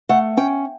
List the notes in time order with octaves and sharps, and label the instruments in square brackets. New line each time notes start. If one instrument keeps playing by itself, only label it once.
[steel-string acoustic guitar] A3 F#5
C#4 G5